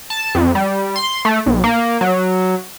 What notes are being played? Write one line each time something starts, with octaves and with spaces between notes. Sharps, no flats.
A5
F2
G3
C6
A3
B1
A#3
F#3